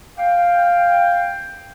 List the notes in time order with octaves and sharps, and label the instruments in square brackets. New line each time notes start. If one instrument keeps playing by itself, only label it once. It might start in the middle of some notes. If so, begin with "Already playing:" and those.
[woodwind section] F5 G5